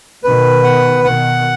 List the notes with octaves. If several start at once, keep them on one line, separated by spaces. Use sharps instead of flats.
B2 D#3 B4
F#5
B2 D#3 F#5